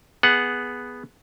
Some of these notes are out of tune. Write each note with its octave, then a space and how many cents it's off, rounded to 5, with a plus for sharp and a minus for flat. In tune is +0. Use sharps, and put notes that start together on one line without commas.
B3 +0 G#4 +0 F#5 +0